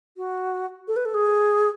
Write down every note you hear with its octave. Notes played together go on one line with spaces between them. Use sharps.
F#4
A4
B4
A4
G#4